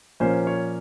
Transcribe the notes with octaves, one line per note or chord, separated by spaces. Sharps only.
A#2 F3 A#3 C#4 C5
C#5